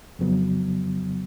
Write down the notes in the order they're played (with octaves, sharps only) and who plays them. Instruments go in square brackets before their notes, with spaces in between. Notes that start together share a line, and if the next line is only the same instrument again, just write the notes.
[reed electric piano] F2 C#3 F#3 B3